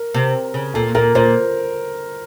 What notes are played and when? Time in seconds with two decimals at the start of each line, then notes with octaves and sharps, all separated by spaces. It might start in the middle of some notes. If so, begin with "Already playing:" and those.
Already playing: A#4
0.14 C3
0.54 C#3
0.74 A#2 A4
0.95 A#2 A#4
1.15 A#2 C5